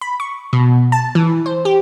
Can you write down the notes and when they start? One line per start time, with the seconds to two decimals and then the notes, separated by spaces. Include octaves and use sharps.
0.01 B5
0.20 C#6
0.53 B2
0.92 A5
1.15 E3
1.46 C5
1.65 G4